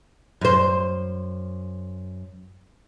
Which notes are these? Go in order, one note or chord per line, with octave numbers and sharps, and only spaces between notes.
F#2 C5